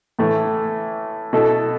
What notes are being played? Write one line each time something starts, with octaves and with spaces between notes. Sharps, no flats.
A2 E3 A3
B2 A3 E4 A4